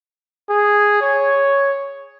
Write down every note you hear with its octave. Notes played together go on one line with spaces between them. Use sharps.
G#4
C#5